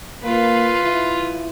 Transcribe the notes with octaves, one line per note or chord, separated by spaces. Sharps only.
A#3 F4 B4
E4